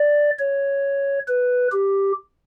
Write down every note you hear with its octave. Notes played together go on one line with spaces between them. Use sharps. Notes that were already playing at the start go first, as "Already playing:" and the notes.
Already playing: D5
C#5
B4
G4